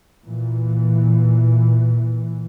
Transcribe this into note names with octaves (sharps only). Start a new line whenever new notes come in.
A#2 E3